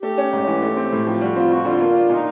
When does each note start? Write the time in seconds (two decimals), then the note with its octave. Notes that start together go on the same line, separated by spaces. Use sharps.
0.02 A3 G4
0.18 C#4
0.33 G#2
0.47 E3
0.62 A3
0.77 C4
0.92 A2
1.07 F3 G4
1.21 G3 F#4
1.36 C4 F4
1.50 F2 F#4
1.65 D3 F4
1.81 A#3
1.95 D4
2.09 A#2 D#4